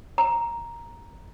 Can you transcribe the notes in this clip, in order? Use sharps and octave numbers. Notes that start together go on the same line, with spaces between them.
A#5